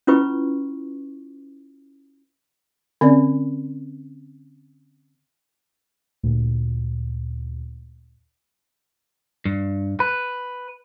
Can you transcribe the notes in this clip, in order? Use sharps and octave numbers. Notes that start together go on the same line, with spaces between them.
C#4 E4 F4 B4 C#6
D3 C4 C#4 D5
D2 A#2
G2
B4